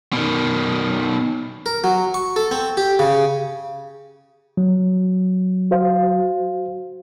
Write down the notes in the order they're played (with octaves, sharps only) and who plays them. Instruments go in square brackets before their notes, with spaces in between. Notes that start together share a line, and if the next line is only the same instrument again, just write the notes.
[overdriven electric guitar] B2 D#3
[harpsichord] A#4
F#3
C#6
A4
C4
G4
C#3
[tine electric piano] F#3
[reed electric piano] F#4 C5 F5